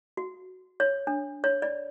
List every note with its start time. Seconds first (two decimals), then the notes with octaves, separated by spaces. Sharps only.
0.17 F#4
0.80 C#5
1.07 D4
1.44 C#5
1.62 D5